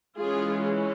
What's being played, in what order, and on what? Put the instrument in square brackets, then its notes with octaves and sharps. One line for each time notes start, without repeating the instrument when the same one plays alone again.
[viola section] E3 G#3 C#4 F4 G#4